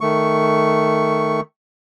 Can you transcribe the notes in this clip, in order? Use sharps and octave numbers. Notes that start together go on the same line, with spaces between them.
D#3 A3 C#6